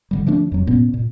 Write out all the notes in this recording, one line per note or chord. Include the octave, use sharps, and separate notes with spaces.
D3 D#3 G3
D3 F3 A3 D4
F2 F#3
A#2 B3 C#4
A#2